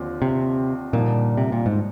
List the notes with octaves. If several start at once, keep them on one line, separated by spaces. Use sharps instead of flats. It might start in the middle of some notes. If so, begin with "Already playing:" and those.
Already playing: D#2 D3 F3 C4 F4
C3
G2 A#2 D3 F3 A#3 D#4
C3
A#2
G#2